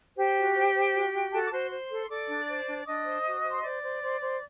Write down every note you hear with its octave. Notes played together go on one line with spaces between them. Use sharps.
G4 C5 G5
F#4
C5
C5
F#4
F#4
F#4 A4 A5
D6
F#4 C5 C6
C5
A4
A4 D5 D6
D4
C5
D4
D4 D#5 D#6
C5
F#4
C5
C6
C5 D5 D6
C5
C5
C5